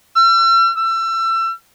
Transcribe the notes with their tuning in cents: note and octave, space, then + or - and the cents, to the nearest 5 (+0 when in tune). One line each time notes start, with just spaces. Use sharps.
E6 +45
E6 +30